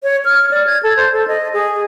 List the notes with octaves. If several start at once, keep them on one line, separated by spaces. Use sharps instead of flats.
C#5
F6
D5
G#6
A4
C5
A4
D#5
G#4